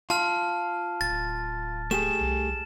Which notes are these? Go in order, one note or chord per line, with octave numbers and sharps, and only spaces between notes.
F4 A5 F6
D1 A6
A3 G4 G#4 E7
C2